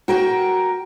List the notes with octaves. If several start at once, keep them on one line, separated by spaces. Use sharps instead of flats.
F#4 A#4 G5